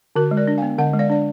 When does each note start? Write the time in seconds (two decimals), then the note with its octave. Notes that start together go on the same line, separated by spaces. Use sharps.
0.16 D3 F#4 A#4
0.31 G#3
0.37 A#4 D5
0.47 D4
0.58 B3 F5 G#5
0.78 D3 D#5 F#5
0.94 G#3
0.99 D5 F5
1.10 D4 D5